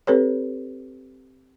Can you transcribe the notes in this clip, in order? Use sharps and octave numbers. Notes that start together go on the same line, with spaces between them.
C4 G4 A4 B4 C#5